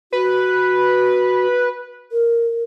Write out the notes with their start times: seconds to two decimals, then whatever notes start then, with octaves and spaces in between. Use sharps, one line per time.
0.13 F#4 B4
2.12 A#4